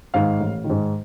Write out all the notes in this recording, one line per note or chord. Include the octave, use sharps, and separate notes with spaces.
G#2 D#3 F5
A1
D#3
G#2